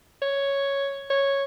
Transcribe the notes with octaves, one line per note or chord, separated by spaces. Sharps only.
C#5
C#5